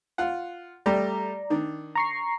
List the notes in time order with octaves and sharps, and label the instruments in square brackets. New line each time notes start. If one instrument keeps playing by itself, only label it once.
[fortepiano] F4 F#5
[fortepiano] G3 A3 G4 [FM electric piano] D5 A#5
[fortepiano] D#3 D4
[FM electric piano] A#5 C#6 C7